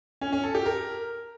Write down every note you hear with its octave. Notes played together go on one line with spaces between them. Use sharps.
C#4
C#4
A4
G4
A#4